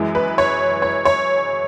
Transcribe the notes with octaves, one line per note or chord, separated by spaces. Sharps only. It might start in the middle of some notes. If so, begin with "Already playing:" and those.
Already playing: F#2 E3 G#3
B4
C#5
C#5
C#5